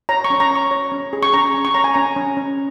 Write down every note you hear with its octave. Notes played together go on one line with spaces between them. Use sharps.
C#5 A#5
C#6
C#4
A#5
C#5 C#6
C#5
C#4
G#4
C#6
C#4 A#5
C#4
C#6
C#5 A#5
G#5
C#4 A#5
C#4
C#4